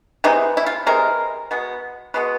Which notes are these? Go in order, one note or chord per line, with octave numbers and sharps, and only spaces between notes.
C3 E3 G#3 D#4
E4
F4
C3 E3 G#3 A#4
B2 G#3 B3
B2 G#3 B3 B4